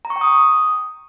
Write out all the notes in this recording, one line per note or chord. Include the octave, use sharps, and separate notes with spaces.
A#5
C#6
G5
D#6